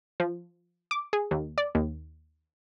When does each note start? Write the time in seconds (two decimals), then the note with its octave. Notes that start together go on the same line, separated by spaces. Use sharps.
0.20 F3
0.91 D6
1.13 G#4
1.31 D#2
1.58 D5
1.75 D#2